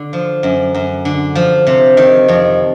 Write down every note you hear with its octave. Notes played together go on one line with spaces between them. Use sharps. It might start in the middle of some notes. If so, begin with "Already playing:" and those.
Already playing: D3
F3
F#2
F#2
D3
F3
C3
D#3
F2